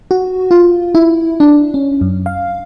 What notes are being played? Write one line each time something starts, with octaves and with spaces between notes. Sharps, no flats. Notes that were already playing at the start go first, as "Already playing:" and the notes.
F#4
F4
E4
D4
C#4
F#2
F5